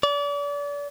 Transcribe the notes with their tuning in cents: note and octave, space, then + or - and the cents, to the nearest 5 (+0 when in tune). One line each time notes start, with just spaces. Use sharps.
D5 -35